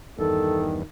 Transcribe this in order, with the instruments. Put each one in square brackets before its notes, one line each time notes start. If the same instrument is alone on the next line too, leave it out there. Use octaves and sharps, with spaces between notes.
[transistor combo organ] E2 G2 [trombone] D#3 [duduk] A4